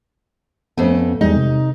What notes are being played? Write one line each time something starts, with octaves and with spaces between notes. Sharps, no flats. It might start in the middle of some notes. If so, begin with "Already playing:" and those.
F2 A3 B3 C#4
E2 G3 G#3 D#4
C3